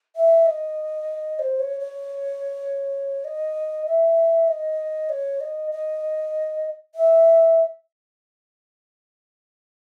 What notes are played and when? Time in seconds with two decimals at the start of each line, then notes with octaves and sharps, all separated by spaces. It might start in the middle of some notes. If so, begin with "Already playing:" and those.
0.16 E5
0.46 D#5
1.39 C5
1.60 C#5
1.80 C#5
3.25 D#5
3.86 E5
4.48 D#5
5.09 C#5
5.41 D#5
5.71 D#5
6.95 E5